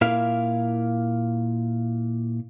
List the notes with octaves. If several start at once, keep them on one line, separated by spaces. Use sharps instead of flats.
A#2 E4 A#4 F5